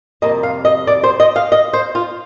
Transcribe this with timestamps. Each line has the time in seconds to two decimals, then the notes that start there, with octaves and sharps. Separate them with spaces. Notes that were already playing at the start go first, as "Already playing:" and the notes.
0.22 F2 C3 G3 A#3 D#5
0.43 F5
0.65 D#5
0.87 D5
1.03 C5
1.20 D#5
1.36 F5
1.52 D#5
1.73 C5
1.95 F4